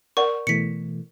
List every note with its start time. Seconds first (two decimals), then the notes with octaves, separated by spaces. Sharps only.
0.17 A#4 D5 F#5 C#6
0.47 B2 E3 A3 B6 C#7